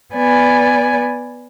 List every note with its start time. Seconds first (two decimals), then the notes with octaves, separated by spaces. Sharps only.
0.14 B3 D5 G#5